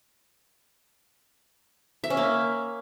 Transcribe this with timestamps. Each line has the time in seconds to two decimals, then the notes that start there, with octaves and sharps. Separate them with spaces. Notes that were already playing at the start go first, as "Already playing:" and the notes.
2.04 E5
2.10 C#4
2.17 A#3